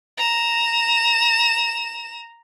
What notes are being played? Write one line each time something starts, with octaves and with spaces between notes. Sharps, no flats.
A#5 E7